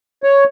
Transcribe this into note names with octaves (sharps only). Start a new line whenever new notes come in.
C#5